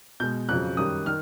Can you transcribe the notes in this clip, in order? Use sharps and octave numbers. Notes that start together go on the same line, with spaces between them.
B2 G#3 G6
F2 C#3 F#3 F#6
F#2 D#3 G3 D#6
D#3 F6